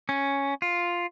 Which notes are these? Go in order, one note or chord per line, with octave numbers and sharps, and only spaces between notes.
C#4
F4